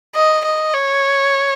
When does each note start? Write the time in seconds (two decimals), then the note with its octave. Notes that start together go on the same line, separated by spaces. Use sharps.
0.15 D#5
0.44 D#5
0.74 C#5